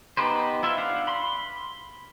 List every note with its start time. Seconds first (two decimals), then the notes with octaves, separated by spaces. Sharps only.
0.17 B3 D#4 G4 B4 C5
0.63 E4 F4 E5
0.78 D4 F5 F#5
1.07 B5 C6